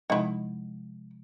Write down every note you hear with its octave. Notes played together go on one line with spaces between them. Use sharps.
C3 F3 G#3 D#4 E4